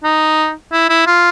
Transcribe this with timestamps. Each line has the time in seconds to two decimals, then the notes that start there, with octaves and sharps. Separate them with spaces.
0.04 D#4
0.72 E4
0.89 E4
1.07 F4